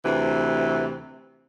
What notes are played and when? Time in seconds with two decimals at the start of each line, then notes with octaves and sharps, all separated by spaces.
0.05 D2 C3 E3